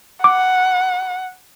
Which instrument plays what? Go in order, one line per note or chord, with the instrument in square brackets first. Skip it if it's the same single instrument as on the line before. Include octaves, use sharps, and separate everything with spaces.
[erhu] F#5 [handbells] D6